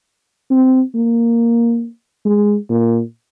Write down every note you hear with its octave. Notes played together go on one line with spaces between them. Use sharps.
C4
A#3
G#3
A#2